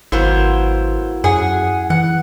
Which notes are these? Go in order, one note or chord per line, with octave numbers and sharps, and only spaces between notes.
G#1 F#3 A#3 B3 E4 C5
F#2 G#4 F#5
E3 F#5